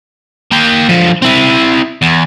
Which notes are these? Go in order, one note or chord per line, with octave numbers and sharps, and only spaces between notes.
A#3 G5
D3 F3
C4 E4
E2